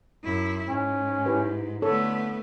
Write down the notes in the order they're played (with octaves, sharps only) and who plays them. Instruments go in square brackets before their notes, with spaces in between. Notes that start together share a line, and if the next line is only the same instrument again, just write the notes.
[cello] F#2 E4
[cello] G#2 [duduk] C#4
[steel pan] E4 G4 B4
[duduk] D3 [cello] A3 B3 [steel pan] A4 C#5